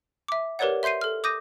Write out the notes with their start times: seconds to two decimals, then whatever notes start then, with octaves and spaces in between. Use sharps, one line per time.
0.28 E5 D6
0.59 G4 A#4 B4 C#5 D5 F#5
0.83 E5 C6 G6 C7 D#7
1.01 A4 F6
1.24 D6 D#6 G6 A#6 D#7